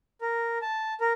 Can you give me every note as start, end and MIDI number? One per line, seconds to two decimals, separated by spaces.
0.21 0.58 70
0.62 0.94 81
1.01 1.13 70